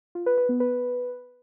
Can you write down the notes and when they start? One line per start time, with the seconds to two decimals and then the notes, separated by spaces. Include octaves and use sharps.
0.15 F4
0.26 B4
0.38 B4
0.49 B3
0.60 B4